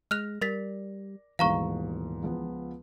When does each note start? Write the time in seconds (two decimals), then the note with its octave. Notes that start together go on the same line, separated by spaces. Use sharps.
0.11 G#3 F6 F#6 A#6 F7
0.42 G3 A#4 D5 A6 B6
1.39 D#1 G#2 B2 E3 F5 A#5 C#6
2.23 C#2 F3 B3